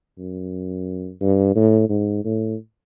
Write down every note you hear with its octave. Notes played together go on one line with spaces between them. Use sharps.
F#2
G2
A2
G#2
A2